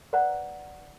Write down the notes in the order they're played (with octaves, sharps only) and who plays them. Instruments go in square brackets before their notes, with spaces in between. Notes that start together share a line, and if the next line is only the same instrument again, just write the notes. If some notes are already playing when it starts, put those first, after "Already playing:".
[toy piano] B4 C5 D5 F#5 A#5